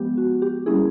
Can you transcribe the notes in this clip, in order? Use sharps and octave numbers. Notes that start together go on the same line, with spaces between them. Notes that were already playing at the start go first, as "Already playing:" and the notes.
Already playing: F3 G#3 B3 G4
F#4
G4
G3 A#3 C#4 E4 G#4